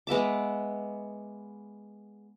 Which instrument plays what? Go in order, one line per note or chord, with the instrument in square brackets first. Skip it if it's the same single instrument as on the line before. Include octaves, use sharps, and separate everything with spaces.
[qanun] G#3 B3 E5 D6